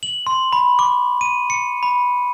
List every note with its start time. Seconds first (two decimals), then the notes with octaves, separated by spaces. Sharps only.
0.03 F#7
0.27 C6
0.53 B5
0.79 D6
1.21 D#7
1.50 C#7
1.83 B5